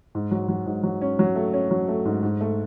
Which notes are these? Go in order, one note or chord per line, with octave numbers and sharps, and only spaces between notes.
G#2
F#3
F#3
G#2
F#3
C#4
F#3
A3
C#4
F#3
A3
G#2
G#2
A3